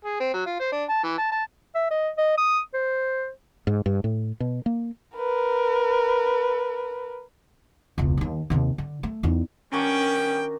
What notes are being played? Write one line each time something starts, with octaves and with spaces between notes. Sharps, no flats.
G#4
C4
F#3
F4
C5
D4
A5
E3
A5
A5
E5
D#5
D#5
D#6
C5
G#2
G2
A2
B2
A#3
A#4 B4
E1 C#2
D#2 D#3
D#2 C3
D3
A3
E2 D#4
D#3 G3 B3 C#4 D4 F#4 G5